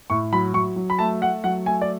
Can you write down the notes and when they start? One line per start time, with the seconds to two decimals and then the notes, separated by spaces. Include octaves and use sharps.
0.10 A2 C#6
0.33 F#3 B5
0.54 F#3 C#6
0.76 F#3
0.90 B5
0.99 A3 A5
1.21 A3 F#5
1.44 F#3 F#5
1.66 A3 G#5
1.81 D5